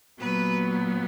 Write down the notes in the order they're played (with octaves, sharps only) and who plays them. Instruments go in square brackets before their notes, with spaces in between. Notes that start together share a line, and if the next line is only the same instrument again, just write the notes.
[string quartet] A#2 F#3 B3 B4